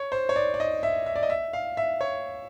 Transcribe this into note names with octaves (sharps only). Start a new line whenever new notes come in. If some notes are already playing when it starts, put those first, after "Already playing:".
Already playing: C#5
C5
C#5
D5
D5
D#5
E5
E5
D5
D#5
E5
F5
E5
C#5